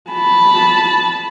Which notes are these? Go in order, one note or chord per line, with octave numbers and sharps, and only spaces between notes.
A5 B5